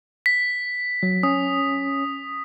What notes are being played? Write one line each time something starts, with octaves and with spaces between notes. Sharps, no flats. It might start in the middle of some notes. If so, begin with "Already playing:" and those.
B6
F#3
C#4 D#6